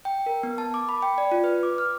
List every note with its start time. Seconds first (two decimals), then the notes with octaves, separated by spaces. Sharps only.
0.05 G5
0.26 A#4
0.43 B3
0.58 A5
0.74 D6
0.89 B5
1.02 G5
1.18 D5
1.32 F4
1.44 B4
1.63 D6
1.78 F6